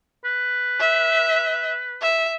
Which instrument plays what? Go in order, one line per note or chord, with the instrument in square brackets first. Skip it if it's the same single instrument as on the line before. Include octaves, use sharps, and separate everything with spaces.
[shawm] B4
[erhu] E5
E5